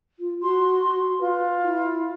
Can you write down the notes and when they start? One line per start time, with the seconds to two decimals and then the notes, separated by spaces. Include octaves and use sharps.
0.19 F4
0.42 F#4 C6
1.20 F4 B4
1.63 E4